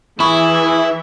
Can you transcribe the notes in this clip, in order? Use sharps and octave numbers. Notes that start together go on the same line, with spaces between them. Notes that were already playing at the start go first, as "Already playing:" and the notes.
E3 E4 G#4 E5 B5 C#6